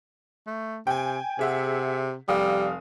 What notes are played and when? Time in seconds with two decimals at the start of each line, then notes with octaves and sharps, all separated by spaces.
0.47 A3
0.87 C3 G5 G#5
1.39 C3 G#4 E5 F#5
2.28 F1 G3 F5 D#6